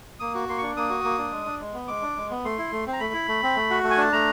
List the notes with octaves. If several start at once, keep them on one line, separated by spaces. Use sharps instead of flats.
A#3 D#6
F#4
A#3 C6
D4 C#6
A#3 D#6
F#4
A#3
D4
G#3
D4
G#3
B3
G#3 D6
D4
G#3
B3
A3 C6
E4
A3
C4
A#5
A3 B5
E4
A3
C4
A3
F#4
A3
G#5
D4 A5
A3 A#5